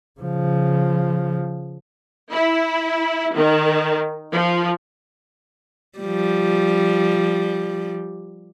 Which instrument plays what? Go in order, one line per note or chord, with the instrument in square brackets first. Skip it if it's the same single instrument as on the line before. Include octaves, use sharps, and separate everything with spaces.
[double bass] C#3 F3
[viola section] E4
D#3
F3
[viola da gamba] F3 G3